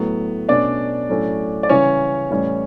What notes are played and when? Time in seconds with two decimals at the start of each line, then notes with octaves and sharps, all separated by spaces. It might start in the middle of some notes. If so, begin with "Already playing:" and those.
Already playing: A2 F#3 A3 B3
0.49 B2 A3 C#4 D4 D5
1.09 A2 F#3 A3 C#4
1.63 D5
1.69 C#3 E3 G3 C#4 C#5
2.31 A2 E3 G3 C#4